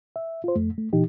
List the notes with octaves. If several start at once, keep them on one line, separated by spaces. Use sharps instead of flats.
E5
F4 C5
F2 A3
A3
A#2 E3 D#4 G4